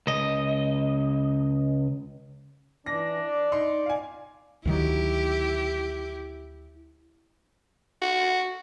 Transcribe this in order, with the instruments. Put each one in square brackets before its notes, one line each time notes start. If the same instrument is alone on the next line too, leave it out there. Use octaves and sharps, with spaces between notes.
[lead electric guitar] C#2 D#5
[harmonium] E3 [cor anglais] D4 [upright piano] A#6
[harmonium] D5
[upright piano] D#4 C6
F5 G#5
[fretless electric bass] D2 D#3 F#3 [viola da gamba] E4 G4
[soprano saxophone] F#4